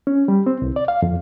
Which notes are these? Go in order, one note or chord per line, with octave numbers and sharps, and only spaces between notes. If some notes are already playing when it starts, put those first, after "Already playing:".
C#4
G3
C4
C2
D5
F5
F2